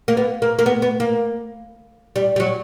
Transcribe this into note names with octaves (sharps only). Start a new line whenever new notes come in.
A#3
B3
A#3
A#3
B3
B3
A#3
G3
G3
F#3